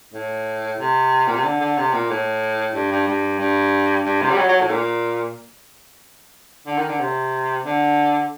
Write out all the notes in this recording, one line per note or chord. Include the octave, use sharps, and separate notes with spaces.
A2
C3
A#2
C3
D3
D3
C3
A#2
A2
G2
G2
G2
G2
G2
C3
G3
F#3
F#3
A2
A#2
D3
D#3
D3
C3
D3